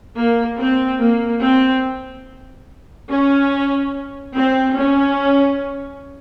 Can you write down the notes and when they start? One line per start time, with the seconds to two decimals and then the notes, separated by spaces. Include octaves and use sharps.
0.17 A#3
0.58 C4
1.00 A#3
1.42 C4
3.09 C#4
4.35 C4
4.76 C#4